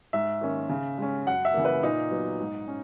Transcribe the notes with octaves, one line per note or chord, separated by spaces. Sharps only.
G#2 E5
D#3 A#3 C#4
C#3
G#3 C#4
F#2 F#5
E5
C#3 E3 A#3
B4
A#2 D#4
F#3 B3
G#2
C#4